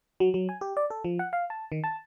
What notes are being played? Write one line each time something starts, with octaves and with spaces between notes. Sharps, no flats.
F#3
F#3
G#5
G4
D5
A4
F3
F#5
F5
A5
D#3
A5